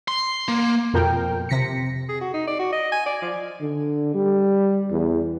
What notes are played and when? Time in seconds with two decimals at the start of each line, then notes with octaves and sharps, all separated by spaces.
0.08 C6
0.48 A#3
0.93 F2 B2 F3 A#4 G5
1.49 C3 A#6 B6 C#7
2.09 G#4
2.21 F#4
2.34 D#4
2.47 D5
2.59 F#4
2.72 D#5
2.92 G#5
3.06 D5
3.22 F3
3.61 D3
4.14 G3
4.91 E2